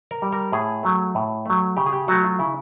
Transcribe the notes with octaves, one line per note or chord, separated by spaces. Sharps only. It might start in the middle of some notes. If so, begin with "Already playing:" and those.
A#4
G3
A#4
A2 G#4
F#3 A3
A2
F#3 A3
C#3 G4
G#4
G4
F#3 A3 F#4
F4
C#3 E4